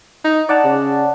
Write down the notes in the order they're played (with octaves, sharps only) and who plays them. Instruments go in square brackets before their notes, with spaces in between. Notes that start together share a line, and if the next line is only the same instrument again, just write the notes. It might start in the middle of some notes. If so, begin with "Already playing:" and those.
[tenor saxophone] D#4
[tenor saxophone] D#4 [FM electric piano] D5 F#5 A5
[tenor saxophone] C#3